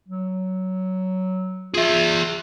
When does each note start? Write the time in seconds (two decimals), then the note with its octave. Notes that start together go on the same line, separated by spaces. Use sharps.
0.08 F#3
1.74 F4 G#4 E5